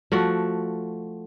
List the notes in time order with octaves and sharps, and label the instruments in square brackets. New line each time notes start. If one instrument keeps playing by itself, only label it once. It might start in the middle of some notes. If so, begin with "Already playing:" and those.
[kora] F3 A3 F#4